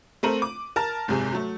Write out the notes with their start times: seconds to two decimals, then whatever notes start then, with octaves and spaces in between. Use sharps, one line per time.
0.23 A3 C4 A4 A#4 D#7 F#7
0.42 D6
0.76 A#4 A5 F6 A6
1.08 F#1 G#2 C3 G#4
1.32 F#3 A3